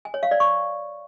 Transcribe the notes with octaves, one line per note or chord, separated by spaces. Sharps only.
G#5
C#5
F5
D5
C#6